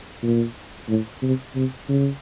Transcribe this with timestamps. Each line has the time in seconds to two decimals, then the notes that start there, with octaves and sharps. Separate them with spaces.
0.23 A#2
0.89 A2
1.23 C3
1.55 C3
1.89 C#3